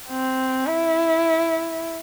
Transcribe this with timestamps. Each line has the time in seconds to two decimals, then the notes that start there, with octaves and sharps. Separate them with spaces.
0.09 C4
0.67 E4